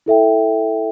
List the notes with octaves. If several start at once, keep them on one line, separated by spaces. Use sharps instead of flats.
E4 A4 E5 G5